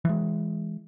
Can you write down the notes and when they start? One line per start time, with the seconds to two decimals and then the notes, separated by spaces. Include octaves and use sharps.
0.05 E3 G#3